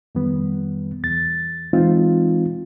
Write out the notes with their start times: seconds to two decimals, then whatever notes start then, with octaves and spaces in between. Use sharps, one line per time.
0.15 F2 D#3 G3 B3
1.04 E2 A6
1.73 E3 G#3 C4 D#4 F4